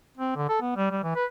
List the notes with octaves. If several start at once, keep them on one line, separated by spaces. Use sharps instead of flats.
C4
D3
A4
B3
G3
G3
E3
B4